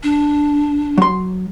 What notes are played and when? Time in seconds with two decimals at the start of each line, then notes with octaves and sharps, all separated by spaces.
0.03 D4
0.98 F#3 C6